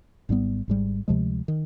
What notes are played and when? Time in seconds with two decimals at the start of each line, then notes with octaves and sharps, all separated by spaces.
0.29 G#1 G#2 G3 B3
0.68 G#1 G#2 G3
1.08 D2 C3 F3 G#3
1.48 D#3